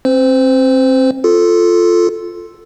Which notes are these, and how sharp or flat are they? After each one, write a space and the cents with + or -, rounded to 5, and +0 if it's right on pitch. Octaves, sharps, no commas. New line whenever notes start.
C4 +30 C5 -25
F4 +0 A4 +0